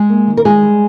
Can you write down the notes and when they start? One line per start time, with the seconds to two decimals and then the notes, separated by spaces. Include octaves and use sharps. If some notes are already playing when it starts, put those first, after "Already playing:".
Already playing: G#3 G#4
0.09 A#3
0.27 D#3
0.37 A#4
0.45 G3 G#3 G#4
0.63 G3